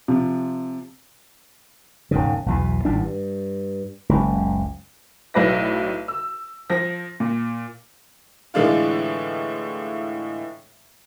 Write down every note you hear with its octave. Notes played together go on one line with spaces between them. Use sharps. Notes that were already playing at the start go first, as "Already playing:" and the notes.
C3 F3
E1 G#2 C#3
B1 E2 B2
G#1 A2 G3 D4
G2
F#1 C#2
B1 A2 B4 D5 A#6
E6
F3 A#6
A#2
A2 D3 E3 G#3 D4 F4